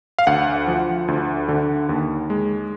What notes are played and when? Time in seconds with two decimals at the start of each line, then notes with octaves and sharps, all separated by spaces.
0.19 F5
0.27 D2 F#5
0.68 F3
1.08 D2
1.48 D3
1.89 D#2
2.30 G#3